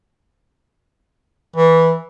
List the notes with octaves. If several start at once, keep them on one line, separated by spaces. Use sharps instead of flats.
E3